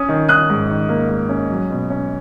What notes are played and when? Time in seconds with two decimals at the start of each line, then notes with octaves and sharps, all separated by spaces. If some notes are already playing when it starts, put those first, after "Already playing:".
Already playing: C#4 D#6
0.08 D#3
0.29 D#3 D#6 F#6
0.49 G#2
0.70 D#3
0.89 A#3
1.09 G#2
1.29 C#4
1.50 F#3
1.70 B2
1.90 C#4